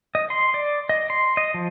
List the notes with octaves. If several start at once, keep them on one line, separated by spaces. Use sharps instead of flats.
D#5
C6
D5
D#5
C6
D#5
F3